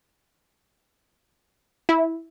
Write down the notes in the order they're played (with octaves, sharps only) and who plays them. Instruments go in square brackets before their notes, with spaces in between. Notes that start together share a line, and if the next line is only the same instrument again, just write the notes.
[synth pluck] E4